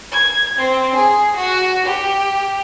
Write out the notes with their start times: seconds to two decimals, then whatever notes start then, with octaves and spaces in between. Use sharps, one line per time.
0.12 G#6
0.58 C4
0.95 G#4
1.36 F#4
1.86 G4